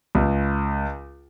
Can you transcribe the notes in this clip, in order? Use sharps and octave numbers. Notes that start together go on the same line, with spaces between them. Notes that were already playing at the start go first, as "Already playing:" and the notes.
C#2